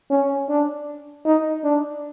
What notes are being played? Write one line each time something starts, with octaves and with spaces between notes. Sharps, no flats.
C#4
D4
D#4
D4